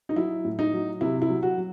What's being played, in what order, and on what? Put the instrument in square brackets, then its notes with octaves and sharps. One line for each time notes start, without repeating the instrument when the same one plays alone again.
[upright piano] D#4
F#3 E4
A2
D#4
F#3
C3 E4
E4
F#3
F#4
F#3